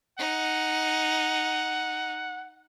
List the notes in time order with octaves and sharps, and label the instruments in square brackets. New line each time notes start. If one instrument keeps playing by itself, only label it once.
[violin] D#4 [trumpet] F#5